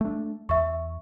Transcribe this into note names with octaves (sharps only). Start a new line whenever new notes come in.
A3 D4
E2 E5 C#6